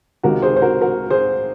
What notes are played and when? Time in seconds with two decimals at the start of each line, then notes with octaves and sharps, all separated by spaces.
0.23 C#2 C3 D#3 F#4 A#4
0.42 G#4 C5
0.56 C5
0.62 F#4 A#4
0.81 F#4 A#4
1.10 G#4 C5